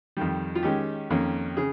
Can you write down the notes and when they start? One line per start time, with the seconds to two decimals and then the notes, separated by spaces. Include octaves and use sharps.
0.17 F2 D#3 G3
0.55 F4
0.63 D#3 G#3 C#4 G4
1.10 F2 D#3 A#3 C#4
1.57 C#3 G#4